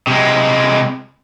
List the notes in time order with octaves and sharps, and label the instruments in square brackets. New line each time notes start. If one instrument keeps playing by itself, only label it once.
[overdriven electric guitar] C3 G#3